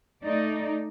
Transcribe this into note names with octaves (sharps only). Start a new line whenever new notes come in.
A3 D#4 D5